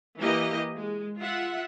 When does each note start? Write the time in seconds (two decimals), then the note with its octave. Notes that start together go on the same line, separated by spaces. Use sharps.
0.18 E3 A#3 G4 D#5
0.76 G#3
1.20 F4 E5 F#5